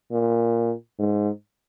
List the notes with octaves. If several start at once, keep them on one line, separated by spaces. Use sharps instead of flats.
A#2
G#2